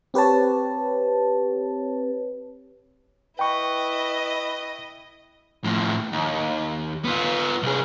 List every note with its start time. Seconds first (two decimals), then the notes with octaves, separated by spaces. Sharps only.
0.14 C4 G4 B4 C#5 A5
3.39 E4 B4 D#5 G5 C#6
5.64 A2 F3
6.13 D#2
7.04 B3 F4
7.63 C2 G#4